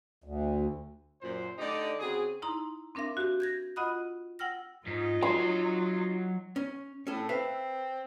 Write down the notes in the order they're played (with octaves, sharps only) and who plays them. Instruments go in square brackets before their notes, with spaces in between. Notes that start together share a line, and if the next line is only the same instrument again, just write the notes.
[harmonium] D2
[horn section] F#2 A#2 C5
D3 A3 D4 D#4 G4 D5
C#3 C4 F#4 G#4
[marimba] D#4 E4 A#5 C6
C4 D4 A#4 E5 F5
F#4 G4
G6 G#6 A#6
F4 D#5 F#5 B5 D#6 F#6
F#5 G5 E6 F6 A#6
[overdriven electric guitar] G#2 [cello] D#4 F4
[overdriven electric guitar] F#3 C#5 [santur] C6
[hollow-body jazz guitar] C#4
[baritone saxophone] A2 [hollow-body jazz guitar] C#4 A4
[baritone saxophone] C4 [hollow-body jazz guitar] B4 E5 F5